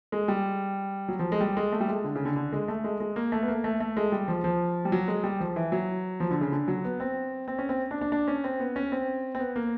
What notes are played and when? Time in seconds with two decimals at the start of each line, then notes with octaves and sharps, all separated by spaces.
0.12 G#3
0.28 G3
1.08 F#3
1.19 F3
1.32 G#3
1.40 G3
1.57 G#3
1.72 A3
1.80 G3
1.88 G#3
2.04 D3
2.15 C#3
2.25 D3
2.36 D3
2.52 G#3
2.68 A3
2.84 G#3
3.00 G#3
3.16 A#3
3.32 A3
3.42 B3
3.48 A#3
3.64 A3
3.80 A3
3.97 G#3
4.12 G3
4.28 F3
4.44 F3
4.85 G3
4.92 F#3
5.08 G#3
5.24 G3
5.40 F3
5.56 E3
5.72 F#3
6.20 F3
6.31 D3
6.41 C#3
6.52 D3
6.68 F#3
6.84 B3
7.00 C4
7.48 C4
7.59 C#4
7.69 C4
7.91 D4
8.01 D4
8.12 D4
8.28 C#4
8.44 C4
8.60 B3
8.76 C#4
8.92 C4
9.35 C4
9.40 B3
9.56 A#3